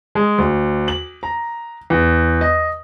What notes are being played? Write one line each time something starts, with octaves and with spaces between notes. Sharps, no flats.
G#3
D2
F#7
A#5
E2
D#5